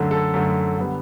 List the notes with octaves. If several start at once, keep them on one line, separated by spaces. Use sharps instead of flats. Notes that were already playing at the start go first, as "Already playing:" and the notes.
Already playing: F#2 D3 A3
A4
F#2 D3 A3
D3 G3 B3